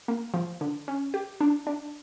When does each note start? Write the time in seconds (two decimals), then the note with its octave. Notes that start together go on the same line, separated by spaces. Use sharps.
0.08 A#3
0.34 F3
0.61 D3
0.88 C#4
1.14 G4
1.41 D4
1.67 D4